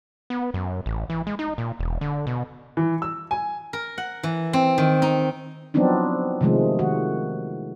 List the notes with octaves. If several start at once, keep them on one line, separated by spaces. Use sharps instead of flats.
B3
F#2
A1
E3
G#3
D#4
A#2
E1
D3
B2
E3
E6
G#5
A#4
F#5
E3
C4
D#3
D#4
F3 F#3 B3 C4 D4 D#4
C3 D#3 F3 G#3 A3
D#3 F#4